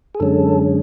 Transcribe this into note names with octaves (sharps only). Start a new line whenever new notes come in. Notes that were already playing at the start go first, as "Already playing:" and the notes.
G#4
F#2 D3 G#3 C#4 A4